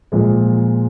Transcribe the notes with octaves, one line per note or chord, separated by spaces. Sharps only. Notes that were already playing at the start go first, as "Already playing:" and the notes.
A#2 F3 G#3